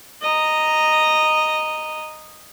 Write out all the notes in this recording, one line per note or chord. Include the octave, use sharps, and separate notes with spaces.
D#5 A#5